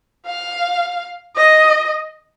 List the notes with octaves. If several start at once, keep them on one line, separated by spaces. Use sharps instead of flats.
F5
D#5